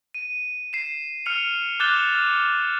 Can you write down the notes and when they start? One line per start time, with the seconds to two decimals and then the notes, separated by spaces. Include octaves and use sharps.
0.14 D#7
0.73 C7 E7
1.26 F6 C#7 F7
1.80 D6 F#6 G6 A6 E7 G7
2.15 F6